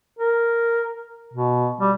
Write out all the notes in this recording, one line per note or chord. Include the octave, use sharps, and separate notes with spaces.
A#4
B2
G3